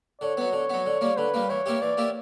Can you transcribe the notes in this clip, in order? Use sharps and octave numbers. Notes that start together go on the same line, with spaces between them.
D3 C#5
F#3 B3
D3
F#3 B3
D3
G3 A#3
D3 B4
G3 A#3
E3 C#5
A#3 E4 G4
E3 D5
A#3 E4 G4